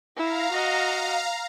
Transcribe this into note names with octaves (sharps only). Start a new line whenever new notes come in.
E4 F5 A#5
F#4 D#5